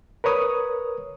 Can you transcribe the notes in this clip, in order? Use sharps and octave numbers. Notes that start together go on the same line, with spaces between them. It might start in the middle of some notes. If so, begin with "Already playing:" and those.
A#4 B4 C#5 D#6